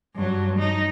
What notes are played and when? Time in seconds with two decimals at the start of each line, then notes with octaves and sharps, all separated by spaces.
0.15 G2 F#3
0.59 D#4